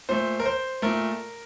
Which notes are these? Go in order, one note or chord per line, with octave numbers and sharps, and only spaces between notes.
A#2 A3 C5
A#4
C5
A#2 A3 A#4